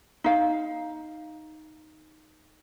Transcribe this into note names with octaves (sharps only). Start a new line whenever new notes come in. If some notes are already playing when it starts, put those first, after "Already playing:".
D#4 F5